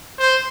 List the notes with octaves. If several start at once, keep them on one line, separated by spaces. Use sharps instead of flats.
C5